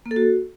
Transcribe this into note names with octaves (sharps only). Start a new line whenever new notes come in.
A#3
A4
F#4